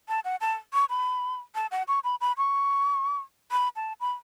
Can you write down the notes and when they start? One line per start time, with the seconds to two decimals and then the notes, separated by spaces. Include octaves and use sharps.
0.08 A5
0.25 F#5
0.41 A5
0.74 C#6
0.90 B5
1.55 A5
1.71 F#5
1.88 C#6
2.04 B5
2.21 B5
2.37 C#6
3.51 B5
3.76 A5
4.00 B5